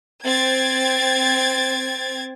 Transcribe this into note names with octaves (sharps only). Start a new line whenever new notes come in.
C4 G#6 A6